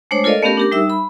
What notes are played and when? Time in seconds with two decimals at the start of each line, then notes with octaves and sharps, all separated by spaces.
0.11 G#3 A3 D4 C5 C#5
0.24 F4 A4 A#4 D5 D#5 F5
0.42 A3 B3 C#4 G4 A#4
0.57 D4 G4 A#4
0.72 G3 D#4 E5 E6
0.90 B5